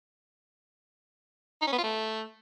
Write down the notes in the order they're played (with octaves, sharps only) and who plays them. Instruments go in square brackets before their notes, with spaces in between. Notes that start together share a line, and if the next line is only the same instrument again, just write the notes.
[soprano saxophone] D#4
C#4
B3
F4
A3